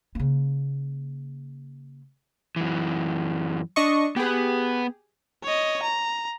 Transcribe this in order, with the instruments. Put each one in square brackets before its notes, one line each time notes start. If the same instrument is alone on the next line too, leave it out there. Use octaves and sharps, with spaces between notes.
[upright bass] C#3 A#3
[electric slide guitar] F#2 E3
[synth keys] D4 D#5 C#6
[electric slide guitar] B3 B4 [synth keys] G4 G#4
[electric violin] C#5 D#5
A#5